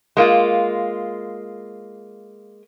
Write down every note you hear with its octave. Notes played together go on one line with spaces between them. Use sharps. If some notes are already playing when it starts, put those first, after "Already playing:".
G#3 A#3 F4